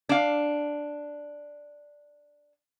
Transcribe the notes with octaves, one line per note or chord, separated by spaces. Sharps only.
D4 F5